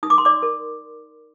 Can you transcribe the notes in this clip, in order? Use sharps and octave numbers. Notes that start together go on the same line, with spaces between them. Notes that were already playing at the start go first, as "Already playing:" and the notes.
D#4 D#6
D6
C6
D5 D6
A#4